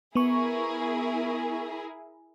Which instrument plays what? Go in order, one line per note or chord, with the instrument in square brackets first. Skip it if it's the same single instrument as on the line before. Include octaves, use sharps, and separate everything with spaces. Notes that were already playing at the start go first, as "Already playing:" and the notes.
[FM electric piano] B3 C#6 [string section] E4 G#4 A#4